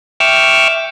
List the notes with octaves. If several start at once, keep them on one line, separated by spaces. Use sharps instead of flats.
E5 G5 C#6 D6 E6 F6